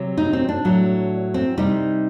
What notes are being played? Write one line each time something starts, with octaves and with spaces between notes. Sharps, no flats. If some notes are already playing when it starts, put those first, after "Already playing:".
Already playing: C3 F#3
D#4
C4
D4
A2 F#3
C4
C3 G3 D#4